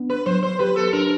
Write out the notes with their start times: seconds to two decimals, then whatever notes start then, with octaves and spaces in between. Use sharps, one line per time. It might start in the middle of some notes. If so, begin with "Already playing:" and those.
Already playing: B3 D4
0.10 B4
0.26 F#3 C5
0.43 C5
0.59 G4 B4
0.76 A4
0.93 D4 A#4